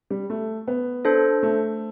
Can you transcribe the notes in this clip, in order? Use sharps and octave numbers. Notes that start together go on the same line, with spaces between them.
G3
A3
B3
D4 A4 C5
A3